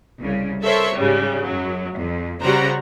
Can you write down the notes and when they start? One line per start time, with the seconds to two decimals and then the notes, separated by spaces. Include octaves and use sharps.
0.19 C2 C#3
0.63 A4 A#4 C5 C#5 E5 C#6
0.94 G#2 C#3 G3
1.44 F#2 F#3
1.96 F2
2.42 C#3 G3 F#4 C5 A#5